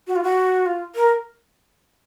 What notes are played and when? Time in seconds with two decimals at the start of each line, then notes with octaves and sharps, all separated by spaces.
0.07 F#4
0.16 F4
0.24 F#4
0.66 F4
0.95 A#4